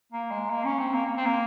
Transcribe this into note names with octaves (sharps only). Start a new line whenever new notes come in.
A#3
G#3
A#3
C#4
C4
A#3
A#3
C4
A#3